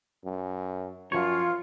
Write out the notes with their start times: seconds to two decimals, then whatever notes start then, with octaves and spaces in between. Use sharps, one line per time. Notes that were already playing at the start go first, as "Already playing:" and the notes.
0.24 F#2
1.12 F#2 F3 F4 C#5